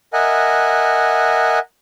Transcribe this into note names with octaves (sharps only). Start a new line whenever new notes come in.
A#4 D#5 E5 F#5 G#5 F#6